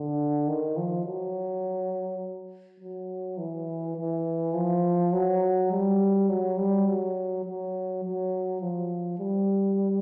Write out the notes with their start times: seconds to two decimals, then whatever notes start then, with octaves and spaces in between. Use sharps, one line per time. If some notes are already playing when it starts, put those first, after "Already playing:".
Already playing: D3
0.48 D#3
0.77 F3
1.06 F#3
2.80 F#3
3.38 E3
3.97 E3
4.54 F3
5.13 F#3
5.71 G3
6.29 F#3
6.57 G3
6.87 F#3
7.45 F#3
8.04 F#3
8.61 F3
9.19 G3